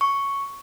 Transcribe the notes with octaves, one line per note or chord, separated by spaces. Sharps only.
C#6